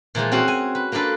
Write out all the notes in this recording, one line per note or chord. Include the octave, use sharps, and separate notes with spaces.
A#2 E3 F3 G#3
C4 C#4 F#4 G#4
G#5
B4
A#3 D4 F4 A4 B4